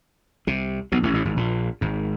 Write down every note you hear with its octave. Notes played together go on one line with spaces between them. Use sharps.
C2 C3
B1 B2
A1 A2
A1 A2
G#1 G#2
A#1 A#2
G#1 G#2